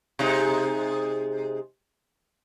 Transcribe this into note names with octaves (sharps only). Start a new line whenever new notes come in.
C3 G#3 D#4